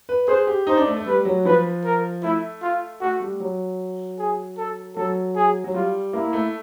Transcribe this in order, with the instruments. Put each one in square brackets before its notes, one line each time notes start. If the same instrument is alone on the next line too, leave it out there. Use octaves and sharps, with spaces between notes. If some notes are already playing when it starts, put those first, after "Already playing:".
[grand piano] B4
[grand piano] G#4 [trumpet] C5
[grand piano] G4
[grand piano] D#4 [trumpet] C5
[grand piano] D4
A3
A3
[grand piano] G3 [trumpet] B4
[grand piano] F#3
[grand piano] F3 [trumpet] B4
[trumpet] A#4
[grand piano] A3 [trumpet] E4
[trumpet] F4
[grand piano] A3 [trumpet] F#4
[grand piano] G3
F#3
[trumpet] G#4
A4
[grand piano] F#3 [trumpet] A4
[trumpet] G#4
[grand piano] F#3
[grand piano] G3 [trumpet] F4
[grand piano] A#3 [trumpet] E4
[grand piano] A3